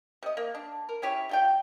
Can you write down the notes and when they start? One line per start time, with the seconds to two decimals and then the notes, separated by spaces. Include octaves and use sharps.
0.23 C3 D#5
0.37 A#3
0.55 D4
0.89 A#4
1.02 C#4 E4 G4 C#5
1.29 G3 F4 G5